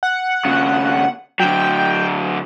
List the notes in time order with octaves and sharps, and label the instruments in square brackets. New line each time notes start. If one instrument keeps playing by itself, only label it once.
[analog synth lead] F#5
[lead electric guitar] D#2 C#3
[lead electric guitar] D3 F#3 [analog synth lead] G5